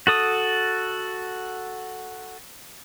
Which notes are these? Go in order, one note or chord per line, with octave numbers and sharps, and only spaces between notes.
F#4 A4 D#6